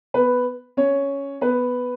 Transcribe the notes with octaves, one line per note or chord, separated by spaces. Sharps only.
B3 B4
C#4 C#5
B3 B4